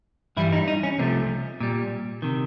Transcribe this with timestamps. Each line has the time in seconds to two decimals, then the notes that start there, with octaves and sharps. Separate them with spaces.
0.37 G2 E3 G3 E4
0.53 D#4
0.68 D#4
0.83 C#4
0.98 C2 C3 F3 A3 C4
1.60 A#2 G3
2.22 C3 D#3